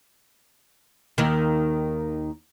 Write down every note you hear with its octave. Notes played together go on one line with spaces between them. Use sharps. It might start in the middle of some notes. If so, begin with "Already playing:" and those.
D#2 D#3